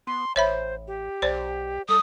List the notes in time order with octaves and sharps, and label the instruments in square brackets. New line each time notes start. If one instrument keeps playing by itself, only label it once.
[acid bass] B3 [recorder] C6
[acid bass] A1 [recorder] C5 [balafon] C#5 E5 B5
[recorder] G4
[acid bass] B1 [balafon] C5 D5
[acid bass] G3 [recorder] A4 [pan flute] D#6